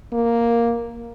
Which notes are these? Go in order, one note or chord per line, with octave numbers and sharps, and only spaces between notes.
A#3